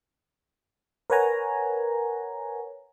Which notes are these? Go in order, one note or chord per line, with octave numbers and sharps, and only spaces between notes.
A#4 B4 C#5 F#5 G#5 A#5